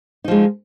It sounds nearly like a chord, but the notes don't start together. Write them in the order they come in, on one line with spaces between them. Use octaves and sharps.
D#4 F3 G#3